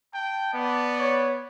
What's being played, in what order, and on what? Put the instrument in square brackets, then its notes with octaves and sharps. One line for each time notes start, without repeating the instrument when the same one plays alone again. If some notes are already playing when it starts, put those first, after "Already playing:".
[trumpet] G5 [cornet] A5
[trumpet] B3 [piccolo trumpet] D5
[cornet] C#5